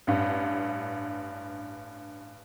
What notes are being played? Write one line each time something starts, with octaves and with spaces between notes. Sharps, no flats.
A1 G2